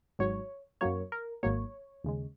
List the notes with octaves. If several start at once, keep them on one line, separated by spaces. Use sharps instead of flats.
G#1 G#2 F#3 C#5
F#2 F#3 A#3 C#5
A#4
G#1 G#2 F#3 A#3 C#5
D#2 C#3 G#3